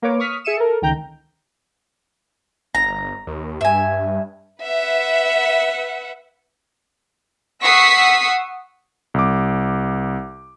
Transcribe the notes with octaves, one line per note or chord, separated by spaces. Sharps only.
A#3 A#4 B4 C#5 D6
C#6 D#6 F6 B6
G#4 E5 C#7 D#7 E7
A4 A#4
C#2 D#3 G5 A#5 G6
G1 A#5
D#2
G2 E5 G#5
B4 E5 F#5
F#5 C#6 D#6 E6 B6 C7
C2 D6